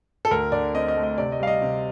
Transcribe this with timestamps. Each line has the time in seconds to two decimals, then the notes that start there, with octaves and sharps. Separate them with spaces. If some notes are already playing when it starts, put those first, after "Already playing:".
0.25 A4
0.31 D2 A#4
0.52 D3 D5
0.74 C4 D#5
0.88 D#5
0.97 A3
1.03 D#5
1.18 C3 D5
1.32 D#5
1.40 G3 F5
1.47 D#5
1.62 C3